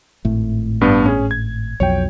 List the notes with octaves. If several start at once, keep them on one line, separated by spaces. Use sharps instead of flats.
G#1 A2 A3
G2 B3 D4
C#4 G#4
G#6
B1 F2 F#3 C#5 G5